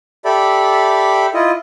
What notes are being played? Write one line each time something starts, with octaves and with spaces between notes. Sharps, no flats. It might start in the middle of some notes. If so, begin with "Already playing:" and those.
G4 A4 D5 E5 B5
E4 F4 D#5